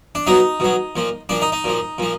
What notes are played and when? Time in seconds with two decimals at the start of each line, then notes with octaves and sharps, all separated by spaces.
0.15 D4
0.27 B2 F#3 D#4
0.60 B2 F#3
0.96 A#2 F3
1.29 A#2 F3 D4
1.41 D#4
1.52 D#4
1.64 A#2 F3
1.98 A#2 F3